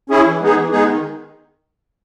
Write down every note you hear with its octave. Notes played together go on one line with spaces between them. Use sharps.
C#4 E4 G#4
E3
G#3 B3 D#4 G#4
E3
G#3 B3 D#4 G#4
D#3